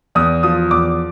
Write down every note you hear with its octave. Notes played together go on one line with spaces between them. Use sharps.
E2 D#6
F3 D#6
E2 D6